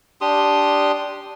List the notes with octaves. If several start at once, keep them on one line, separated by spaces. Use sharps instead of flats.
D4 G4 C6 D#6